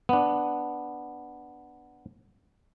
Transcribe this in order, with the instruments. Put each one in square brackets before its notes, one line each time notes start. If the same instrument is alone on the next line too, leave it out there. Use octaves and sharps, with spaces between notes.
[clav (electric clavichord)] B3 D4